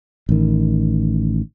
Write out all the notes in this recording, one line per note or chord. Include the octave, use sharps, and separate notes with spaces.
A1 D#3